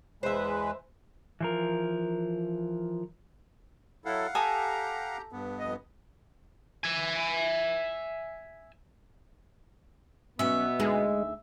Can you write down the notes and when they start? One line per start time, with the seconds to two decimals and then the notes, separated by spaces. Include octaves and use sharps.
0.23 E2 G#3 B4 C5 E5
1.40 E3 F3 A#4
4.06 F#3 E4 A4 F5 F#5
4.35 G4 A4 G#5 A#5 D#6
5.32 G2 B3
5.59 F2 D#5
6.84 E5 G#5
10.39 B2 F#3 B3 C#4 E5
10.80 D2 G#3 D#4 G#4